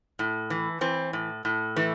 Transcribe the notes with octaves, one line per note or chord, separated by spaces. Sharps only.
A2
E3
E3 C4
A2
A2
E3 A3